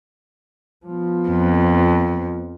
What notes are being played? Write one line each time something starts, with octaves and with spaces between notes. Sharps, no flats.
F3 B3
F2